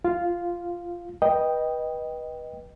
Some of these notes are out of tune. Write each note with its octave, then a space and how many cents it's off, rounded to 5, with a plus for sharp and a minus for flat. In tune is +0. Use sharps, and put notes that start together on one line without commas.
F4 -10 F5 +0
B4 -25 D#5 +0 G5 +0